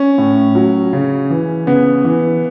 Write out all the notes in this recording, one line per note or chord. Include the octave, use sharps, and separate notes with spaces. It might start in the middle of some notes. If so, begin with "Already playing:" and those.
Already playing: C#4
A2
F#3
C#3
E3
C#3 B3
E3